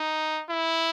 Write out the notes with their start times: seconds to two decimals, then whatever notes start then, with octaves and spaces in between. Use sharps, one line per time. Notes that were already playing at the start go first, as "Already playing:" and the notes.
Already playing: D#4
0.49 E4